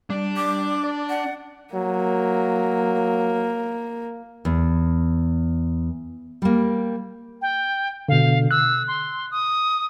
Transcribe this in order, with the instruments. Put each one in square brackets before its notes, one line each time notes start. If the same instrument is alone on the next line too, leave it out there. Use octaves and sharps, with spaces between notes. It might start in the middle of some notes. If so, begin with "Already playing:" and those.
[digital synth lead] G3 [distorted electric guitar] D4
[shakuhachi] D6
[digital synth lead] D5
[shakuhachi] F#5
[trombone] F#3 [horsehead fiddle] A#3
[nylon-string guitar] E2
G3 A#3
[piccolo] G5
[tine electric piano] B2 D3 [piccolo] F5
[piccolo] E6 [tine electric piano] F#6
[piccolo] C6
D#6